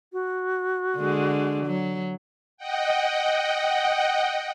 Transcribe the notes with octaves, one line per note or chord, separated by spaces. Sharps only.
F#4
D3 G#3
F#3
D#5 F#5 G5